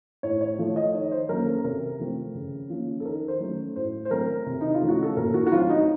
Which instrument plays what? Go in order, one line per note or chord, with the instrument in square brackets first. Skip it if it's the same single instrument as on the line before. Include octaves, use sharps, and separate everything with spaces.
[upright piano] A2 C#5
C#5
F3 A3
D#5
D#3 C#5
C5
F#3 A#3 C#4 A#4
A4
C3 A#4
F3 A3 C4
C#3
F3 A#3 C#4
A4
D#3 A#4
C5
F#3 A3 C#4
A2 C5
C5
F#3 A3 C4 A#4
C3
D#4
F4
F3 A3 C#4
F#4
A4
A#2 A#4
F#4
F#4
F#3 A3 C4 F4
D#4